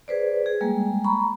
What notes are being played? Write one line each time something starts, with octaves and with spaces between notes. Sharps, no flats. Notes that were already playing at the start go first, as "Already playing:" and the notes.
G#4 B4 C5 D5
G#4
G3 G#3 A#3
A#5 B5 C#6